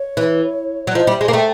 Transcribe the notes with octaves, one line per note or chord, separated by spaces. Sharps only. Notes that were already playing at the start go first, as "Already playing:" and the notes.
Already playing: C#5
E3
F#3
F3 D#5
G3 E5
G#3
A#3
A3 G5